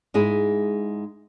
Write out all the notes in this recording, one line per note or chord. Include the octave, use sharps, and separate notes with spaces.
G#2 G#3 E4 G#4